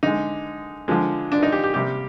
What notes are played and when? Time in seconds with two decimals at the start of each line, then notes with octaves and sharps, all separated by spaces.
0.03 D3 G#3 D#4
0.88 D3 F3 G#3
1.32 D4
1.43 D#4
1.52 G4
1.64 G4
1.74 C3 G3 A#3 G4